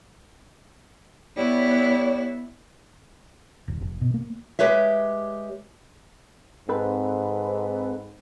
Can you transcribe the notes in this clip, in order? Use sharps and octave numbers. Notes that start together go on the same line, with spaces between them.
G3 B3 E4 C#5
D#1
F1
B2
A#3
G#3 G4 B4 C#5 E5
G#2 C4 A4 B4